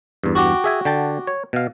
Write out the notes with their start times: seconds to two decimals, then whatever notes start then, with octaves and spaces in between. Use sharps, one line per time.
0.24 E2 G2
0.35 F#4 G4
0.64 G#4 E5 G#5
0.85 D3 G5 A5
1.27 C#5
1.53 B2 F5